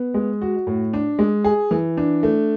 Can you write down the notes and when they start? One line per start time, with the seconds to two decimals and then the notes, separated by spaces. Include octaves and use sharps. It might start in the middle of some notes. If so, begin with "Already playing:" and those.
Already playing: B3
0.14 G#3
0.41 F#4
0.67 A2
0.93 D4
1.19 G#3
1.44 G#4
1.71 E3
1.97 D4
2.23 A3